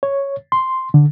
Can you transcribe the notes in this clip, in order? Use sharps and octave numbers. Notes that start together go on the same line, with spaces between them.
C#5
C6
D3